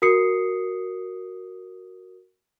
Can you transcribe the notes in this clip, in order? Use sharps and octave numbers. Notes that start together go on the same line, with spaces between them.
F#4 A#4 D#6 C7 C#7